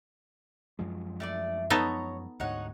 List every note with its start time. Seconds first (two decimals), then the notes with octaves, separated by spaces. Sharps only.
0.79 F#2 F3 G#3
1.20 A3 D4 D5
1.70 B3 D#4 A4 C#5 A#5
2.40 D2 G#2 D#4 C#5 F#5